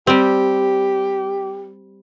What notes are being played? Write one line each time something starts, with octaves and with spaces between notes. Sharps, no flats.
G3 C4 G4